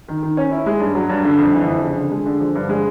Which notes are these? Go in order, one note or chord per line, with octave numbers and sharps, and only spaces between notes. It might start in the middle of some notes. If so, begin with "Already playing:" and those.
D#3
D#3
C#4
E4
G#3
G2
F#3
G2
D3
F2
E3
F2
C#3
D3
G#3
D3
F3
G2
G#3